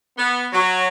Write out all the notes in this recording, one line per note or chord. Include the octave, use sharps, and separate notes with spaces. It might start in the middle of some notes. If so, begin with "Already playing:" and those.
B3
F#3